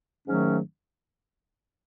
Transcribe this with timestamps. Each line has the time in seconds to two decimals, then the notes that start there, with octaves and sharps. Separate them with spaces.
0.26 G#2 D#3 F#3 A3 C#4